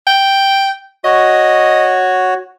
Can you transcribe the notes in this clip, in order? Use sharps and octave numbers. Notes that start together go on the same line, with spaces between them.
G5
F#4 C#5 D#5